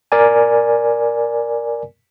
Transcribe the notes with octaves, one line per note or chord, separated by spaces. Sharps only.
A#4 D5 G#5